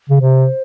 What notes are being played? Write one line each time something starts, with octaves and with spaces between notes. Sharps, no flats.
C#3
C3 C5